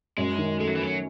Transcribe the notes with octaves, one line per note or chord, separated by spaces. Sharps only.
F#2 G#3
D#3
G#3 A3
F#3
E3
F#3 C#4